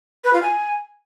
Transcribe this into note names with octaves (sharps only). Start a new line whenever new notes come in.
B4
F4
G#5